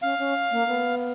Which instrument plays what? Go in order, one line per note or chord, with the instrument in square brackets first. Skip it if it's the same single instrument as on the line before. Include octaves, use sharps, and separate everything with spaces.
[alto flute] C#4 [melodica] F5
[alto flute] C#4
A#3
B3